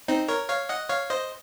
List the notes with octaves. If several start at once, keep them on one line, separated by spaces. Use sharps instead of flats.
C4 D#4
A#4 C#5
C#5 F5
D#5 F#5
C#5 F5
C5 D#5